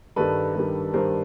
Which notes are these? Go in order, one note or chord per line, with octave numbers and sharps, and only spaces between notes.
G2 D#3 G3 A4 B4
G2 D#3 G3
G2 D#3 G3 A#4 C5